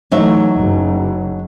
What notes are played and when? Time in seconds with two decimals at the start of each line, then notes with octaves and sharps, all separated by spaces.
0.11 E3 F#3 A3 D#4 E5
0.55 F#1